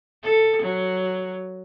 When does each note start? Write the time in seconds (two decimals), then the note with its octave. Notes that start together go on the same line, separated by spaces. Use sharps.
0.23 A4
0.62 F#3